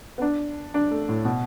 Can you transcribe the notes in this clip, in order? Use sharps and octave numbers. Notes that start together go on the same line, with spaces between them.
B3
D4
D4
A3
A2
B2